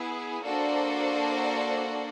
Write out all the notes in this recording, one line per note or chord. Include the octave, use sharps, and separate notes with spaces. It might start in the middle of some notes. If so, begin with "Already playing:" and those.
Already playing: B3 E4 G#4
A#3 D4 F#4 A4 C5